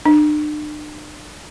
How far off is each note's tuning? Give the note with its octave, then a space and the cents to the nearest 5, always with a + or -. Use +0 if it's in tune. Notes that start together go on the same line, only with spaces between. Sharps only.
D4 +45